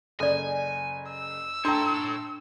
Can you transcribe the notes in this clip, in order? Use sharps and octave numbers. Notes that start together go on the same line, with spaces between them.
F#1 A4 D5 G#5
E6
D4 A4 C#5 G5 A5 A#5 C6